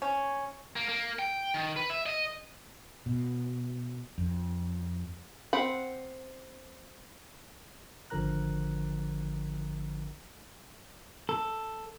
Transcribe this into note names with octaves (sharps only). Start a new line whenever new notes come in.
C#4
A#3
A#3
G5
D#3
B4
E5
D#5
B2
F2
C4 F#5 B5
G#1 D3 F3 A#4 A#5 F#6
A4